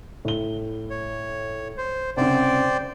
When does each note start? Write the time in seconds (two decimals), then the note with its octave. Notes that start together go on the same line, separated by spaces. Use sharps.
0.25 A2 G7
0.90 C#5
1.78 C5
2.17 C2 C#3 C5 D5 G5